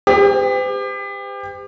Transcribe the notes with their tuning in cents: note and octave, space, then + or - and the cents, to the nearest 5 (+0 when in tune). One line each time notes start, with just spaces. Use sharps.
G4 +30 C5 -45